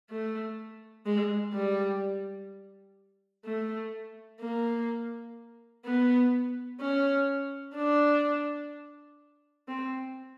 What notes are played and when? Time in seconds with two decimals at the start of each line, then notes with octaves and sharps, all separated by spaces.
0.10 A3
1.06 G#3
1.54 G3
3.45 A3
4.41 A#3
5.85 B3
6.81 C#4
7.76 D4
9.68 C4